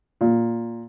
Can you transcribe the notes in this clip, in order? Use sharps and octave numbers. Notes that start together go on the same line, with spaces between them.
A#2